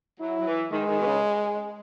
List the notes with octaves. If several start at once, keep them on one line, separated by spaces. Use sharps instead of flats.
F#3 E4
F#3
E3
D#3 G#3
D#3
B2
C#3